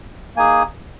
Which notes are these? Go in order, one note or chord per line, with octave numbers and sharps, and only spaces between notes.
A#3 D#4 G#4 G#5